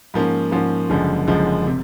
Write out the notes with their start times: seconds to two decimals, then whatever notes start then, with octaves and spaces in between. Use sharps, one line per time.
0.14 G#2 F3 A#3 C#4
0.52 G#2 F3 A#3 C#4
0.90 F#1 F#2 D3 F3 G#3
1.27 F#1 F#2 D3 F3 G#3
1.66 C3